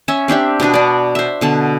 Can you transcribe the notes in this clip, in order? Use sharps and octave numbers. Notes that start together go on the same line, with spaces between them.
C#4 E5
C4 D4 G4 E5
B2 B3 D4 F#4
D4 D5
C5 E5
B2 D3 A5